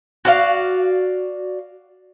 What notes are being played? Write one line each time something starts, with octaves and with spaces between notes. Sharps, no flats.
F#4 D5 F5